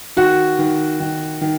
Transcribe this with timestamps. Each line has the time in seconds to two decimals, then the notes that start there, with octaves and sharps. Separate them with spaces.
0.17 D#3 F#4
0.59 D#3
1.00 D#3
1.41 D#3